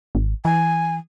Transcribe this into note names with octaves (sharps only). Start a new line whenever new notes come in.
G#1
E3 G#5